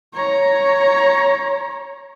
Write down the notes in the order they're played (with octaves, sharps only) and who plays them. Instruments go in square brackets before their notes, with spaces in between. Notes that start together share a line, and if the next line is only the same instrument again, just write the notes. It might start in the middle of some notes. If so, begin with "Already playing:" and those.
[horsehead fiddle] C#5 A#5